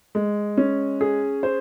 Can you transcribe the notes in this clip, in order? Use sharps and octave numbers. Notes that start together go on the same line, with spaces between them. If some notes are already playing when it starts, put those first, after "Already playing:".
G#3
C#4
G#4
C5